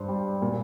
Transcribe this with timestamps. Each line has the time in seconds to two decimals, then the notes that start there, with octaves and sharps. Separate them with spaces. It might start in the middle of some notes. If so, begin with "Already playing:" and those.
Already playing: G2 C5
0.08 G3
0.42 A#2